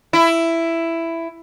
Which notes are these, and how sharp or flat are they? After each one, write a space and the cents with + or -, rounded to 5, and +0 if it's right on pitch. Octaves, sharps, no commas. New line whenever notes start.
E4 +10